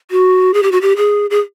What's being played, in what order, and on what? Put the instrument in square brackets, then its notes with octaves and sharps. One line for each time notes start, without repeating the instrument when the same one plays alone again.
[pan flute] F#4
G#4
G4
F#4
G4
G#4
G#4